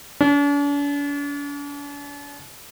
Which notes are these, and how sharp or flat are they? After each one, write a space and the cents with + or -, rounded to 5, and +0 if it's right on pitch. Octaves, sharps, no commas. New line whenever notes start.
D4 -45